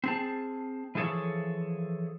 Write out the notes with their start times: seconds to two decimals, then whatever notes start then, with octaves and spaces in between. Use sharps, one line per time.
0.04 C4 G#4 A5
0.95 E3 F3 G#4 A4 C#5